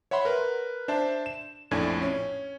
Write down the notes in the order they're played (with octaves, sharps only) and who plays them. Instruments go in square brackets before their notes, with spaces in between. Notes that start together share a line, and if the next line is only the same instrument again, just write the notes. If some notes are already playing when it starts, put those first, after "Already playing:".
[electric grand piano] C#5 E5 F#5 B5 C6
A#4 B4
D4 C5 E5 A5
E7
A#1 F2 A2 D4 G#5 G#6
C#4